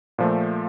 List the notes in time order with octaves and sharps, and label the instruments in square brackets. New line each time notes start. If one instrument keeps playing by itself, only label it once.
[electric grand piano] A#2 F3 A3